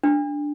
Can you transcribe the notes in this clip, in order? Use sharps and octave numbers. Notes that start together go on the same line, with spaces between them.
D4